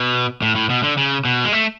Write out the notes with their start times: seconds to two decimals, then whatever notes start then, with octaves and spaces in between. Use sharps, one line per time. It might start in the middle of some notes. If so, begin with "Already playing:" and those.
Already playing: B2
0.42 A2
0.56 A2
0.70 B2
0.83 D3
0.97 C#3
1.25 B2
1.44 G#3
1.52 A3